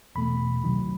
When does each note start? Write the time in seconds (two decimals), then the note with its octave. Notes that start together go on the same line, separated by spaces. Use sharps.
0.15 E2 B2 A3 B5
0.63 C2 C3 D#3 F#3